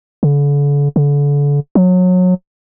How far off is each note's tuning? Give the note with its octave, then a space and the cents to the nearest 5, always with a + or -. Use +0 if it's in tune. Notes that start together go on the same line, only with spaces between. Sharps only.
D3 -40
D3 -35
F#3 -25